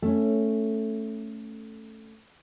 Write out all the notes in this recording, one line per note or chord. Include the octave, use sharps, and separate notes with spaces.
A3 C#4